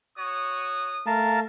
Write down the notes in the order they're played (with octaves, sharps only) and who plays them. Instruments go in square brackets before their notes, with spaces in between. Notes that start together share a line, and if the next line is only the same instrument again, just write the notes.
[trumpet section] F#4 C#5 D#6
[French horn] A3 [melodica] A#4 F5 A5